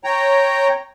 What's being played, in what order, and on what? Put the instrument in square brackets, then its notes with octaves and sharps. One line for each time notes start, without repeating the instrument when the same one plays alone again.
[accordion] C#5 G5 A#5